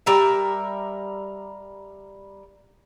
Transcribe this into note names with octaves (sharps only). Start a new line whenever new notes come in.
G3 A#4 E5